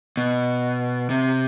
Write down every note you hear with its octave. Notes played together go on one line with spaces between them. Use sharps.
B2
C3